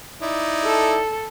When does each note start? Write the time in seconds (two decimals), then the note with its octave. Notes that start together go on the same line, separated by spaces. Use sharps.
0.22 D#4 E4 D5
0.64 A4